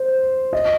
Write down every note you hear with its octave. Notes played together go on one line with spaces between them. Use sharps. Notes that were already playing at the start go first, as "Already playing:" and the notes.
Already playing: C5
D#5